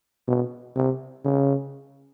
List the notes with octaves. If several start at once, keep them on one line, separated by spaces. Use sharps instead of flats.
B2
C3
C#3